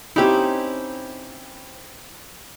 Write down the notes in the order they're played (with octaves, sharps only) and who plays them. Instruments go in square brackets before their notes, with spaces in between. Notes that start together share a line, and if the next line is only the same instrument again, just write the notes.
[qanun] C4 C#4 D#4 [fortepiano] E4 G4